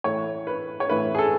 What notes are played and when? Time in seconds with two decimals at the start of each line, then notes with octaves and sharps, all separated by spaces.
0.04 A2 E3 A3 C#5
0.47 B4
0.80 C#5
0.89 A2 E3 A3 B4
1.15 G#4
1.19 A4